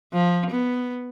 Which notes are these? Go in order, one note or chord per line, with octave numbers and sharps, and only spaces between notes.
F3
B3